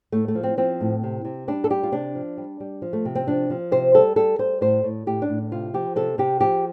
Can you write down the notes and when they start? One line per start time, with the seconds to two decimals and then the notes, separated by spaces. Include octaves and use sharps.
0.12 A2 A3
0.28 A3
0.35 F3
0.43 C4
0.57 F3 C4
0.81 A2
1.03 C3
1.25 C3
1.48 G3 D4
1.64 A4
1.70 G3 G4
1.83 F4
1.92 C3 D4
2.15 F3
2.37 G3
2.60 G3
2.82 F3
2.93 A3
3.05 C3
3.15 C4
3.27 F3 D4
3.50 F3
3.71 C3 C5
3.94 G3 A4
4.16 G3 A4
4.39 G3 C5
4.61 A2 C5
4.83 A2
5.06 A2 G4
5.22 D4
5.29 A2
5.51 C3 F4
5.74 F3 G4
5.96 C3 A4
6.18 C3 G4
6.41 F3 G4